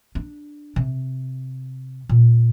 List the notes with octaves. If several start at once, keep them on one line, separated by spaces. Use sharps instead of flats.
D4
C3
A#2